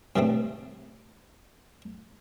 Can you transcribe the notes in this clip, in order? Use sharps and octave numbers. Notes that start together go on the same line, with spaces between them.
G2 C#3 E3 A3 C4